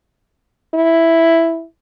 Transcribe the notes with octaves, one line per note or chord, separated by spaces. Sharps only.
E4